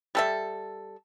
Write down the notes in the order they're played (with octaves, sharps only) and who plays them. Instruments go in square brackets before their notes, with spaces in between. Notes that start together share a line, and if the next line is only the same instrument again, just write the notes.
[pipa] G3 A4 E5